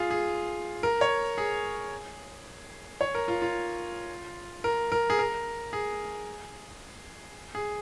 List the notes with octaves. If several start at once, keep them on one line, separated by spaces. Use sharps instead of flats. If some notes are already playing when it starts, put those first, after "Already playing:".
Already playing: F4 G#4
G#4
A#4
C#5
G#4
C#5
A#4
F4
F4
A#4
A#4
G#4
A#4
G#4
G#4